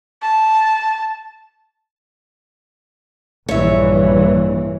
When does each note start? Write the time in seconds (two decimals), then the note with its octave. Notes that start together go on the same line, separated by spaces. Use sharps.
0.22 A5
3.49 A#1 G2 E3 C#5 E5